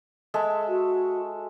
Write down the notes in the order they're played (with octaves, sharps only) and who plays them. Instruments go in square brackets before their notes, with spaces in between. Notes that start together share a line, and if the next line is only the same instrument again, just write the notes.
[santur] G#3 A4 E5
[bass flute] F#4